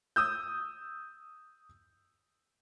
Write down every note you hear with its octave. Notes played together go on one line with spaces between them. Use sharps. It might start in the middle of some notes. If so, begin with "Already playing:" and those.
D#6 E6 G6